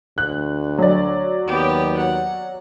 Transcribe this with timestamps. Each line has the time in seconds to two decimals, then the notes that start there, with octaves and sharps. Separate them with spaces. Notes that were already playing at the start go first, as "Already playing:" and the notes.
0.18 D2 F#6
0.78 F#3 D5
1.47 D#2 B3 G4
1.97 F#5